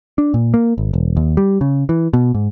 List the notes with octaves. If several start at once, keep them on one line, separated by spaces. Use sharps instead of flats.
D4
A#2
A#3
G#1
E1
D#2
G3
C#3
E3
B2
G#2